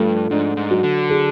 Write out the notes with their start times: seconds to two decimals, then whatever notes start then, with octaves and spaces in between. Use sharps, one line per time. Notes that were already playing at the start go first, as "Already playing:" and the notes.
Already playing: G2 F3 A3
0.30 G#2 D4
0.57 G#2
0.71 F#3
0.83 D3
1.10 G#4